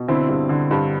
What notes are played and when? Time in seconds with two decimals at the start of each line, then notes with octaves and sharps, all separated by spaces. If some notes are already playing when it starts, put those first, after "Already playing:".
Already playing: B2
0.08 D3 C4 E4
0.29 G2
0.49 D3
0.71 G2